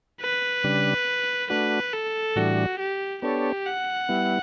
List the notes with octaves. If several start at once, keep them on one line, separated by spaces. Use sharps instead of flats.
B4
C#3 G3 D4
A3 D4 F#4 B4
A4
A2 E3 G3 D4 F#4
G4
B3 D4 G4 A4 C#5
F#5
G3 B3 E4